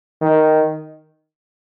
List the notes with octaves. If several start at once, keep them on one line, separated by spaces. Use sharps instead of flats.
D#3